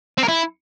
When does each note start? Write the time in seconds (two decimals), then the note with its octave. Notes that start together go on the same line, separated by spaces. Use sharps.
0.18 C4
0.23 A#4
0.28 E4